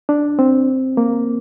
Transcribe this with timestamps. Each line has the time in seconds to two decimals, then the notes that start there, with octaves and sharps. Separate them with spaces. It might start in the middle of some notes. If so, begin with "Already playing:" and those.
0.09 D4
0.39 C4
0.97 A#3